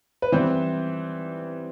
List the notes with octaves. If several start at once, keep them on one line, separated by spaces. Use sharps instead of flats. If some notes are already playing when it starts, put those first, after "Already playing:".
B4
E3 G3 B3 C4 C5